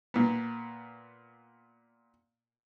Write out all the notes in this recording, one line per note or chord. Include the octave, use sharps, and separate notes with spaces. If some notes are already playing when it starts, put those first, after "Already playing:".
A#2 B3